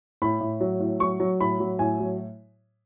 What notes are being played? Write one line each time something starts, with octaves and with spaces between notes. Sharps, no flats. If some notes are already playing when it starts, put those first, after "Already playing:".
A2 B5
A2
F#3
A2
F#3 C#6
F#3
A2 B5
F#3
A2 G#5
F#3